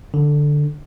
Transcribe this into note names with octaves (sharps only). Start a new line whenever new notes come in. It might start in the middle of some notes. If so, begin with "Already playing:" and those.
D3